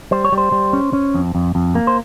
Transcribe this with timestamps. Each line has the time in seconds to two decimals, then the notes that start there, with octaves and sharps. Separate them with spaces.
0.11 G3 C5
0.25 C#5
0.32 G3
0.38 C5
0.52 G3
0.73 C#4
0.93 C#4
1.14 F2
1.35 F2
1.55 F2
1.75 A#3
1.87 C5